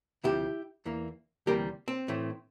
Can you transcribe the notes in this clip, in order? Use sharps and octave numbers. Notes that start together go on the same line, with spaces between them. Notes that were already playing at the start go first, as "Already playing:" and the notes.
D2 C3 F3 E4 G4
E2 E3 A#3
D2 C3 E3 G3 A#3 G4 A#4
C4
A2 E3 A3